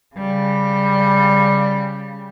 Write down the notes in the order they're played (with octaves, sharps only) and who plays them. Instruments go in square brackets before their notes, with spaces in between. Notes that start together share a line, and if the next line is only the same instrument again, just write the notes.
[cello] C#3 G3